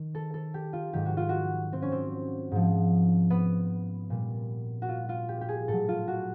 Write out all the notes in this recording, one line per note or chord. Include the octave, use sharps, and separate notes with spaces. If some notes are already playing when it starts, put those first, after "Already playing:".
Already playing: D#3
A4
A4
G4
F4
G#2 D#3 F#3 G4
F#4
F4
F#4
C4
C#4
C4
G#2 F3
B3
A#2 G3
F#4
F4
F4
G4
G4
G#4
A2 F#3 A4
F4
F#4